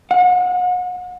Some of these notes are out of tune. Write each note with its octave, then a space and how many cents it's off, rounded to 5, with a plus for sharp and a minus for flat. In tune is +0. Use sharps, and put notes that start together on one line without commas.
F#5 -35